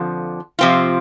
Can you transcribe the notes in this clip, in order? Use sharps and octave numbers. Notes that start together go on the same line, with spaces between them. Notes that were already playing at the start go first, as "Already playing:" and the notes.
Already playing: F2 D3 F3
C3 F3 C4 F4